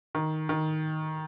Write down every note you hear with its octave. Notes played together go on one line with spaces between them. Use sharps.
D#3
D#3